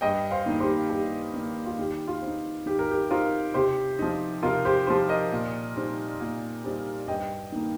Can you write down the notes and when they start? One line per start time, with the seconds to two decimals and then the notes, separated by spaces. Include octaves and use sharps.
0.01 G2 D#5 G5
0.31 C5 F5
0.46 D#3 A#3 D#4
0.60 G4 C5
0.89 G2 G4
1.34 D#3 A#3 D#4
1.66 F4
1.78 D#3 G4
2.08 F4
2.22 C4
2.27 D#4
2.66 D#3 G4
2.79 A#4
2.91 G4
3.10 C4 D#4 F4 A#4
3.54 C3 G4 C5
3.99 F3 D#4
4.43 C3 F4 A#4
4.65 G4 C5
4.87 F3 D#4 G4 C5
5.09 A#4 D#5
5.31 A#2
5.75 G3 C4 D#4
6.20 A#2
6.64 G3 C4 D#4
7.08 G2 D#5 G5
7.52 D#3 A#3 D#4